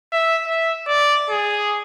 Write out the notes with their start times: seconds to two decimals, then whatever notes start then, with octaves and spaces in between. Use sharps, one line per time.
0.13 E5
0.47 E5
0.87 D5
1.30 G#4